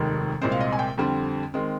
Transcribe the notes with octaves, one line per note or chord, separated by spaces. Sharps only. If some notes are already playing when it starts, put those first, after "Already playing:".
Already playing: F1 D#2 D#3 G#3
C2 A#2 G#3 C4 C5
F5
D#5
G#5
G5
F2 D3 G3 C4
D#3 G#3 C4